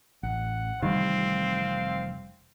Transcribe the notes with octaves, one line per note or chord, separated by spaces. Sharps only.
A1 F#5
F1 D#3 E3 G3 C4 F5